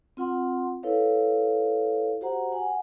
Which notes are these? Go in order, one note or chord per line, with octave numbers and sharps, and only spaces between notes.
C4 F4 F#5 C6
E4 A4 B4 C#5 F5
F#4 G4 C5 F#5 A#5
F#5 G#5